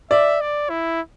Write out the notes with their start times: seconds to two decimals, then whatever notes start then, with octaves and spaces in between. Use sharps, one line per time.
0.11 D5 E5
0.41 D5
0.70 E4